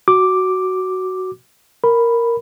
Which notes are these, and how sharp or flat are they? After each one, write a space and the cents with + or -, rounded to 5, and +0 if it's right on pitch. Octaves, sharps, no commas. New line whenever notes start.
F#4 +10 D6 +0
A#4 +0 B5 +0